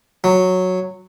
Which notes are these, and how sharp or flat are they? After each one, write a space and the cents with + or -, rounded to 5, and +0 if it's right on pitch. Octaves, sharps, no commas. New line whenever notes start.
F#3 -5